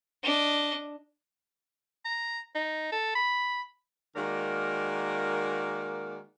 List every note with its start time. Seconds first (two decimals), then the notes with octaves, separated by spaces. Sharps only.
0.23 D4 D#5
2.05 A#5
2.55 D#4
2.92 A4
3.15 B5
4.16 D#3 G#3 A#3 F#4 A#4 D5